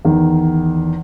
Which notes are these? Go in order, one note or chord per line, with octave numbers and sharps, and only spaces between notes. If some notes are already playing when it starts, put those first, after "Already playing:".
E2 D#3